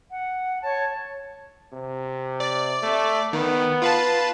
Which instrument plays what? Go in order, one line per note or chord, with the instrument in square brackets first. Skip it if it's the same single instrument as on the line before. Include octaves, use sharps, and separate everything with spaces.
[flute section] F#5
C#5 A5
[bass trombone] C3
[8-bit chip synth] D5
[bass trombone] A3
[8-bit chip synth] D#3 [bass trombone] B3
[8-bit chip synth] F4 B4 A5